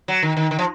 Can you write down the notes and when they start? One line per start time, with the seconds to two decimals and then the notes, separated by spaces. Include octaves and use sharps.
0.08 F#3
0.22 D#3
0.37 D#3
0.51 D#3
0.59 F3